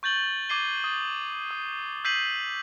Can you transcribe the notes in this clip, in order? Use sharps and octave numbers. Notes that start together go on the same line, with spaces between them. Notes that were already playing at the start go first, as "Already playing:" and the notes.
C#6 G6 A6 F#7 G7
D6 G#6 C7 D#7 G7
D#6 A6
D#6
E6 G6 B6 C7 D#7 F#7